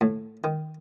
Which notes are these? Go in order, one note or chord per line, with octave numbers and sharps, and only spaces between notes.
A2
D#3